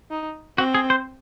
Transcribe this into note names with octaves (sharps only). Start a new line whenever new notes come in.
D#4
C4 F#4
G#4
C5